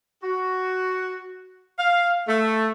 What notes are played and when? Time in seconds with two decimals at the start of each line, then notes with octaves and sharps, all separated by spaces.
0.23 F#4
1.79 F5
2.28 A3